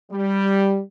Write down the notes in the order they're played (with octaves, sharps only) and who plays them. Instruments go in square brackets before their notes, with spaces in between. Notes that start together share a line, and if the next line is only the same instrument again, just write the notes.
[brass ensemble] G3